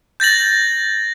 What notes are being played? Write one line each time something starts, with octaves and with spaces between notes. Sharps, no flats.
G6 A6 A#6 F#7